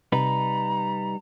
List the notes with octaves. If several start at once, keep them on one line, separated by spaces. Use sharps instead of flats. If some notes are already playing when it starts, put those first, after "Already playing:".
C3 G3 D#4 B4 A#5